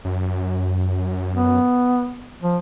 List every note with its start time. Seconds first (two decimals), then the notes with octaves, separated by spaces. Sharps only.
0.05 F#2
1.35 B3
2.42 F3